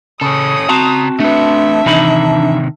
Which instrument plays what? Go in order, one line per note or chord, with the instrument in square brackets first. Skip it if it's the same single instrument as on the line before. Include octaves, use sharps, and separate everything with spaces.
[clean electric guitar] C#3 [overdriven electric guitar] C#4 A4 [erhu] D#6
[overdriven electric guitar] C#3 A#5 [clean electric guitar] C4 F#4 A5
[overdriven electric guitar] A3 B4 [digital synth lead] D4 [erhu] E5
[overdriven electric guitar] C3 D#3 [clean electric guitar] E3 D#4 B5